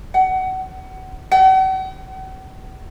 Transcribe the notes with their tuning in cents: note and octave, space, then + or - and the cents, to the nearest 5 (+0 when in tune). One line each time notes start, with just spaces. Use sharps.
F#5 +25
F#5 +45